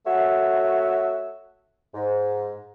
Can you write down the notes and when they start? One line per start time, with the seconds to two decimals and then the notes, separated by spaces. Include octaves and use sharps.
0.06 A3 F#4 C#5 E5
1.94 G#2